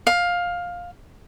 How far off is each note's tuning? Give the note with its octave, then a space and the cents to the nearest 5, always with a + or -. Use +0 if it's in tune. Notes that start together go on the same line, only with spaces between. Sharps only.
F5 +15